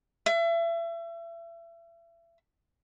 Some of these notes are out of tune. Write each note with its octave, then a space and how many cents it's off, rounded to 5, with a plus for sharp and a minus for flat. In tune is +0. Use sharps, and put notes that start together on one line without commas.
E5 +35